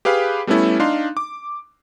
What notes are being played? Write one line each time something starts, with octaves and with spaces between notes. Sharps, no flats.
G4 G#4 B4 F5 B5
G3 A3 B3 C#4 E4 A4
D4 D#4 F5 C6
D6